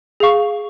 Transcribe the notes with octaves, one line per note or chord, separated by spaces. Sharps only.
G#4 F5 C#6